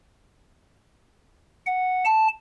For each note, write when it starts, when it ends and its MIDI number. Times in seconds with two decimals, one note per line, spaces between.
1.66 2.04 78
2.05 2.28 81